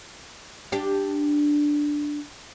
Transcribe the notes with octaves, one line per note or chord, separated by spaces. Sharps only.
D4 G4